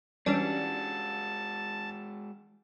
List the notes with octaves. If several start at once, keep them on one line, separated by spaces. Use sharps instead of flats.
E3 G3 G#3 C#4 D4 F#4 C#5 A5